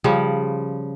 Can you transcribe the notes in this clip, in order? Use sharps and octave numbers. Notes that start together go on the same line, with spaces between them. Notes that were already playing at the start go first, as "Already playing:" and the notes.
C#3 F3 G3